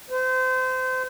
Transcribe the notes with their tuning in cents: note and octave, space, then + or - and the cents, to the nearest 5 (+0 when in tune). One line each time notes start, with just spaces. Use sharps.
C5 -30